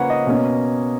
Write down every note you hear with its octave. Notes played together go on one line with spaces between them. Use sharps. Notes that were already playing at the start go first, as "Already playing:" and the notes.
Already playing: C#3 F3 A#3 B4 C#5 F#5
D#5
B2 A#3 C#4